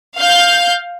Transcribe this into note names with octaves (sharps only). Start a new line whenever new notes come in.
F5 G6